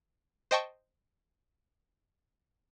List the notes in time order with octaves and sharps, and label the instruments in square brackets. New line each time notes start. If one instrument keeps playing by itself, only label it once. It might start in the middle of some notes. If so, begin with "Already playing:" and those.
[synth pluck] C5 D#5 G5 A5 C#6